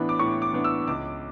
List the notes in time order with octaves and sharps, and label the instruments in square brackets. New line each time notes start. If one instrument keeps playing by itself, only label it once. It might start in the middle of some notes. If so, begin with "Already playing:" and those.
Already playing: [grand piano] A2 E3 B3 D4 B5
D6
A2 C#6
D6
E3 B3 D4
E6
C#2 D6